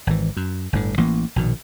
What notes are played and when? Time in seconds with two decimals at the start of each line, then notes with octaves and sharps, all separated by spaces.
0.07 G#1 E3
0.36 F#2
0.73 G1 A2 D3
0.97 A1 E3 A#3
1.36 A#1 B2 D#3